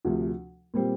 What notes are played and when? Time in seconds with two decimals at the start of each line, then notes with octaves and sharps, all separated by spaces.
0.05 D2 C3 F3
0.74 A#2 G3 C4